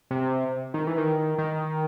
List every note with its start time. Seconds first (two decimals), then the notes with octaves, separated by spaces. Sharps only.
0.11 C3
0.74 D#3
0.87 E3
0.98 D#3
1.38 D#3